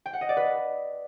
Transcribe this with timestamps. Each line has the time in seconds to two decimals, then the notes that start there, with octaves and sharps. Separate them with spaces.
0.06 G5
0.13 F#5
0.21 D#5
0.29 D5
0.37 B4